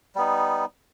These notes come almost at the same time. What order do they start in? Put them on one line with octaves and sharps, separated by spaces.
G3 B3 D#4